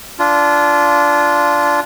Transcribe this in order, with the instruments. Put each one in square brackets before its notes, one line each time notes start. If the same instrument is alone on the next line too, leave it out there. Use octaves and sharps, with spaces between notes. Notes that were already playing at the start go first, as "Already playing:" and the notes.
[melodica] D4 F4